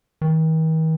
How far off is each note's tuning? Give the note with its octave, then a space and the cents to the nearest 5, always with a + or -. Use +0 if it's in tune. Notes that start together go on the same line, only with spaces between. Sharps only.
D#3 +45